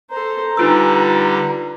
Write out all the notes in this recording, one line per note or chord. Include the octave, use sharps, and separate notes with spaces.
A4 C5 A#5
D3 G3 D#4 F4 B4 E6